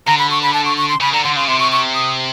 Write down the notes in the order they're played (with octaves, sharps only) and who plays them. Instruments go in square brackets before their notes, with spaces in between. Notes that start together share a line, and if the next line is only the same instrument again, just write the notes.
[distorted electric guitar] D3 [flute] A#5
[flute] B5
C#6
B5
A5
C#6
C#6
C6
[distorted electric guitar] C#3 [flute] B5
[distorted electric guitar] D3 [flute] A#5
[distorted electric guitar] D3 [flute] C6
[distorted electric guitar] C#3 [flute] C6
[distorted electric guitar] C3 [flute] C6
[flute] C#6
C#6
D#6